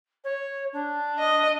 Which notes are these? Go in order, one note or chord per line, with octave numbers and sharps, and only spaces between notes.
C#5
D4
D#5